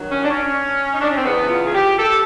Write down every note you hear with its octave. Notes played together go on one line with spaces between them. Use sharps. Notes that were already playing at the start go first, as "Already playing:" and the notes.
Already playing: G2 D#3 F#3
C#4
D4
C#4
D#4
D4
C#4
C4
E2 C#3 E3 B3
F4
G#4
G4
A4